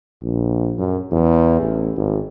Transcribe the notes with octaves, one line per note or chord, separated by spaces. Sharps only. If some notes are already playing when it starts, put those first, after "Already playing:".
A#1
F#2
E2
A1
G#1